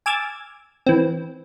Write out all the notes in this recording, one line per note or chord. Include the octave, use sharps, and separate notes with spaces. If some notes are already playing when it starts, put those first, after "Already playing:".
G#5 D6 E6 F6 G#6 A6
E3 C4